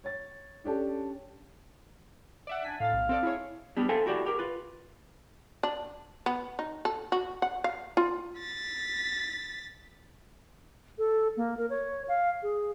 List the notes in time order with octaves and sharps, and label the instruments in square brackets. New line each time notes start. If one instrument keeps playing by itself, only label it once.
[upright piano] C#5 A6
C#4 D4 G4 A4
[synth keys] D5 E5 F#5
[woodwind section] D4 G#5 [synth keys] B6
[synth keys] A2 A6 [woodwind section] F5
[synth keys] B1
C4 A4 D5
E4 G#4 C#5
[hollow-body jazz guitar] G3 B3 D4 G4
A4 C5 E5 F5 G5 G#5
E4 F#4 G4 D5 F#5
G4 A#4
F4 B4
[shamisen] D4
B3
D#4
A4
F#4
F#5
F5
F4
[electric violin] A6 B6
[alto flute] A4
A#3
A#4
C#5
F5
G#4